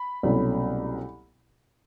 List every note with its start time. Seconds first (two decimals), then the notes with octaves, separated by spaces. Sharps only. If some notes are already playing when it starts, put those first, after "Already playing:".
Already playing: B5
0.23 C2 B2 F#3 A3 C#4